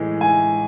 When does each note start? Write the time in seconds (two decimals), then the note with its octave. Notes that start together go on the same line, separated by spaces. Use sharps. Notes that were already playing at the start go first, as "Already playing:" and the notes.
Already playing: A2 E3 G#3
0.21 G#5